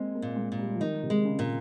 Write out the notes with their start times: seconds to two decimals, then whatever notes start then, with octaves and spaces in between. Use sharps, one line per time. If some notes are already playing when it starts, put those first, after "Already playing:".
Already playing: G#3 A#3 C4
0.15 A#3
0.22 A#2
0.36 G#3
0.52 A#2
0.59 G3
0.75 F3
0.80 D#3 D#4
1.03 C3
1.10 G#3
1.25 C#3
1.39 A#2